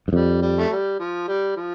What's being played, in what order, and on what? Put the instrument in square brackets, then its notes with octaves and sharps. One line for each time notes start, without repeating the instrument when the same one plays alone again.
[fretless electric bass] G2
[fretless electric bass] F2 [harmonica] G3
[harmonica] G3
A3
G3
F3
G3
F3